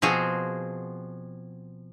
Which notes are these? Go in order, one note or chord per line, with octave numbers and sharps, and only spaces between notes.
B2 F3 C4 F#4 G#4